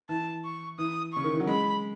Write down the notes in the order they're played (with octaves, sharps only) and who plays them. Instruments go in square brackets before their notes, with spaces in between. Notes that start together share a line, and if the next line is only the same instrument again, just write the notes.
[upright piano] E3 [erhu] A5
[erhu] C#6
[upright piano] E3 [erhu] D#6
[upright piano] C#3 [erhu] C#6
[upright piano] D#3
E3
F#3
[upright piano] G#3 [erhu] B5